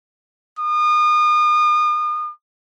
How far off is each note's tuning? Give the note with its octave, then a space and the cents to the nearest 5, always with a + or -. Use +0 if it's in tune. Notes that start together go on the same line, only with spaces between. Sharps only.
D#6 -35